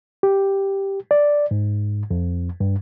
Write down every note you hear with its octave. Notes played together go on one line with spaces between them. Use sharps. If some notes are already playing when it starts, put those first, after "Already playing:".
G4
D5
G#2
F2
G2